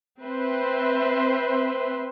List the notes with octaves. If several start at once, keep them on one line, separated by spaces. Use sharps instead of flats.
C4 B4 C5 E5